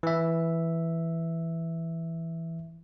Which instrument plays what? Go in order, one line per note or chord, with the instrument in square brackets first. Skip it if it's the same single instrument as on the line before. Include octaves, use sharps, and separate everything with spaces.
[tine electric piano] E3 E5